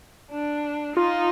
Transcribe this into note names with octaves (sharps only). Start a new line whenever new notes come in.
D4
D#4 F4